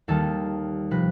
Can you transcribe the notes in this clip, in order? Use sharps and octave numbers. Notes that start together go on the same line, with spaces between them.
D#2 D#3 G3 A4
C3 F3 B4